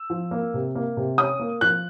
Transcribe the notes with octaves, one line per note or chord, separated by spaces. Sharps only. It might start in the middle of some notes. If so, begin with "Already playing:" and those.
Already playing: E6
F3
A#3
C3
A#3
C3
C#4 D#6
A#3
F3 F#6